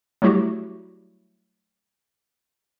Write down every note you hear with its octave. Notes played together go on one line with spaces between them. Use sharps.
F#3 G3 A3 E4 F#4 G4